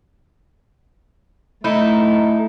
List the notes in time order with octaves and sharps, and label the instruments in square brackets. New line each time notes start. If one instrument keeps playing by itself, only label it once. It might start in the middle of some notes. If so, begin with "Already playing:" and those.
[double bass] A3 [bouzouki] D#4 E4 A4